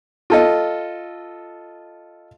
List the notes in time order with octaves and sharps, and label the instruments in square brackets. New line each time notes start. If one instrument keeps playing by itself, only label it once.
[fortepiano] F4 A4 D#5